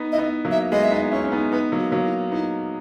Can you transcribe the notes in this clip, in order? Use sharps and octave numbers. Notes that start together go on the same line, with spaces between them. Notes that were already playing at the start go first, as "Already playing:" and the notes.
Already playing: B3 D#4
E4 D#5
B3 D#4
F#3 A#3
E5
G#3 B3 D#5
E4 E5
B3 D#4 D#5
C#4 E4 C#5
C#4
B3 D#4
B3 D#4 B4
F#3 A#3
F#4
F#3 A#3
E4
B3 D#4 E4